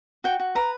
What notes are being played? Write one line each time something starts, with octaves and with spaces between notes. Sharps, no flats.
F#4 G5
F#4
B4 A#5